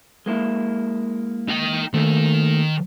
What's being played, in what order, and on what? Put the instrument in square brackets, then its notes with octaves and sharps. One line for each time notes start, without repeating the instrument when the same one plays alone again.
[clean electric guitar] G#3 A#3 E4
[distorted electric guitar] D#4 G5
[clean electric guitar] D#2 A3 [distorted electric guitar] D#3